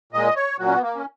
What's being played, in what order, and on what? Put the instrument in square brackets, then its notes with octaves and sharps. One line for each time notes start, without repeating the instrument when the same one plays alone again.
[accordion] A#2 G#3 D#5
C#5
A#2 F#3 F#4
C#4
B3
A#3
C#4